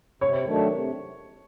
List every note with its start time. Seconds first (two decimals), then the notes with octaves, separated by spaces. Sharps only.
0.21 C3 C#5
0.44 D#3 F#3 A3 D4
0.68 C3